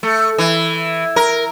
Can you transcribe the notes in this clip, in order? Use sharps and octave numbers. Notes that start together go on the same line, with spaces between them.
A3
E3
A#4